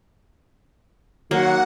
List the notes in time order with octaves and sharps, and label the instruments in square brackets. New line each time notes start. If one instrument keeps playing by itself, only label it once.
[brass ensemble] D#3 F#3 [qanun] A#3 [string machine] F#5